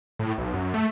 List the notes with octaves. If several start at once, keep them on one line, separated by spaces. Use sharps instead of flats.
A2
B1
F#2
A3